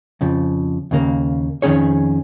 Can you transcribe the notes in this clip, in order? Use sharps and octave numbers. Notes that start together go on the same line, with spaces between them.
F2 C#3 F3
D#2 C#3 A#3
F2 D#3 C#4 G#4 C#5